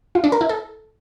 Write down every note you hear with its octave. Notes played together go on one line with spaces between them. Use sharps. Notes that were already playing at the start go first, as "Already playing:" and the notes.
F4
D4
A#4
E4
A4